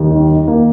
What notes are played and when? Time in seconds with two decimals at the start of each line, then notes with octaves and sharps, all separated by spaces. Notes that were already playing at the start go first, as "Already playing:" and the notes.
Already playing: D#2
0.10 D#3
0.30 D#3
0.47 A#3